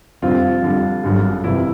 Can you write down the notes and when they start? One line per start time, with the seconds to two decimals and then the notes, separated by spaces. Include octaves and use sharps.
0.22 F1 F2 D3 G3 C4 F4
0.62 F2 D3 G3
1.04 G#1 F#2 D3 G3
1.44 G1 F2 C3 E3 E4